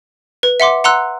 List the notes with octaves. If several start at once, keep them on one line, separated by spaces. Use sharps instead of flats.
B4
E5 F#5 C6 D6
F#5 A#5 C6 E6 F#6